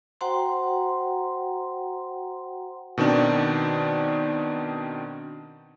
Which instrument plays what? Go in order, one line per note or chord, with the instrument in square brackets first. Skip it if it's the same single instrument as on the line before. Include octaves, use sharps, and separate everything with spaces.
[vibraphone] F#4 C5 F#5 G5 A#5 C6
[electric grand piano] B2 D#3 C4 D4 D#4